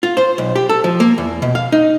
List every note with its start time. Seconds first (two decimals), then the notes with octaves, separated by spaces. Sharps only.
0.03 F4
0.17 C5
0.38 B1
0.56 G4
0.69 A4
0.84 F3
1.00 A#3
1.18 E2
1.42 B2
1.55 F5
1.72 D#4